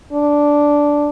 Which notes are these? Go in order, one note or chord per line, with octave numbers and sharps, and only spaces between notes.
D4